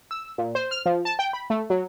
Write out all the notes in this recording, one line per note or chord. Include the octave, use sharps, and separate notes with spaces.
E6
A#2
C5
F6
F3
A5
G5
B5
A3
F#3